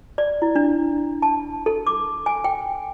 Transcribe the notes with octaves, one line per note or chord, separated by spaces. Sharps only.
D5
E4
D4
A5
A4
D6
G#5
G5